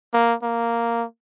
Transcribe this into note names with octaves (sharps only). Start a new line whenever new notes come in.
A#3
A#3